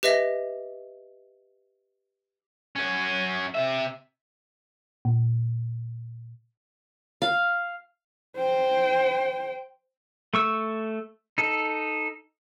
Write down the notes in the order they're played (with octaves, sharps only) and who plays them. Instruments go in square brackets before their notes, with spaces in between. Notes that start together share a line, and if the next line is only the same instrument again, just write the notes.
[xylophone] G4 B4 D#5 E5 A#6
[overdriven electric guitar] F#2 C#4
C3 E5
[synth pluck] A#2
[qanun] F5
[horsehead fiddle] C5 G5
[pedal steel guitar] A3 C#6 E6
D#4 A4